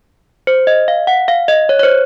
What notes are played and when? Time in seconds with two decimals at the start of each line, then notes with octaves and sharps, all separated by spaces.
0.47 C5
0.67 D#5
0.88 F5
1.07 F#5
1.28 F5
1.48 D#5
1.69 C#5
1.79 C#5
1.83 C5